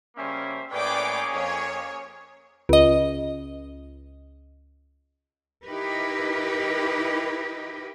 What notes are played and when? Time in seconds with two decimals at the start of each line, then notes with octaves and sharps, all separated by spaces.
0.17 C#3 G3 A#3 C#4 C5 E5
0.71 A2 A#3 C#4 G#4 B4 D5 G5 D6
1.32 F2 C#5
2.69 C#2 D#5
5.66 D#4 E4 G4 A#4 B4